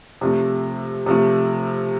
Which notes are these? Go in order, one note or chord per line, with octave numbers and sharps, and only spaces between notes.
C3 F3 A3
C3 F3 A3